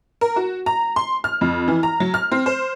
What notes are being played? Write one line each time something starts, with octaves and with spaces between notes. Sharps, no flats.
A#4
F#4
A#5
C6
F6
F2
E3
A#5
F#3
F6
C4
C5